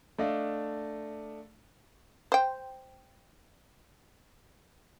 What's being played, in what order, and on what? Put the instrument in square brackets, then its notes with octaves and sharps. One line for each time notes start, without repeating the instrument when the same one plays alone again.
[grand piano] A3 D4 D#5 F5
[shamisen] C5 G5